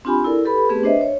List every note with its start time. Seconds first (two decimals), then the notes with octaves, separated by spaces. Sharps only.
0.05 C4 D4 F4 G4 G#5 B5
0.24 E4 A4 A#4 D5
0.45 G4 A4 B4 B5
0.69 A3 B3 C4 G4 G#4 B4
0.83 D4 B4 C5 D#5 E5
1.01 C#5